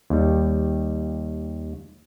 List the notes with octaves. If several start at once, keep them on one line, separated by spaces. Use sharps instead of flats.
D#2 G3